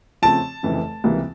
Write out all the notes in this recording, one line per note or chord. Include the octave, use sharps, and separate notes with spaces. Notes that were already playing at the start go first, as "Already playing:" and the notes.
C#3 F3 A3 C4 A5
F1 F2 C#3 E3
C#2 C3 E3 G3 A#3